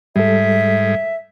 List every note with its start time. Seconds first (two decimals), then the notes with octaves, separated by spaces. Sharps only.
0.16 G#2 G3 A4 E5